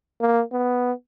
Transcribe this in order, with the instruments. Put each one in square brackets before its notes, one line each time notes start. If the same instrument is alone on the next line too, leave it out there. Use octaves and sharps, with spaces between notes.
[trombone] A#3
B3